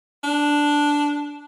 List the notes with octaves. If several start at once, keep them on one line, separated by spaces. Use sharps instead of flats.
D4